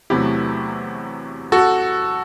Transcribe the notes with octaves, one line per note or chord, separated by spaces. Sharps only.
E2 C3 F#3 A3 E4 G4
F#4 A4